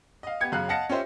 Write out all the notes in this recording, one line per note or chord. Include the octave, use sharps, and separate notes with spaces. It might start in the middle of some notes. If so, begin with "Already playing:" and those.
D#5 F5
B3 G4 G#6 C#7
F#2 C#3 F5 F#6
D#5 F5 F#5 A5 A#6 C#7
C#4 F4 G4 C5 E5